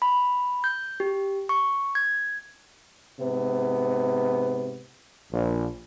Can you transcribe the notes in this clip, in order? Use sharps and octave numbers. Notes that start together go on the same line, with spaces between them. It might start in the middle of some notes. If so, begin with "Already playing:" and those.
B5
G6
G4
C#6
G#6
G#2 C3 B3
A#1